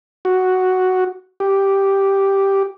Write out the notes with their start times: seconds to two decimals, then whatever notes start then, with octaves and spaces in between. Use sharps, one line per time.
0.25 F#4
1.40 G4